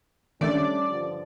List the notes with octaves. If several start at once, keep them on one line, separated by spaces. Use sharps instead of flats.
D#3 G3 A3 C#4 D4 A4 D5
G2 D3 F3